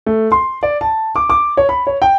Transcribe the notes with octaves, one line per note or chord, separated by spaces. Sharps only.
A3
C6
D5
A5
D6
D6
C#5
B5
C#5
G5